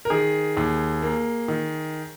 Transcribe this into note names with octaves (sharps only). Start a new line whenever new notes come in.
A#4
D#3 G#4
D#2
A#3
D#3